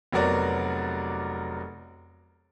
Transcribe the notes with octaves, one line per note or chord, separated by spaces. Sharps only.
F1 F#3 B3 F#4 A#4 D5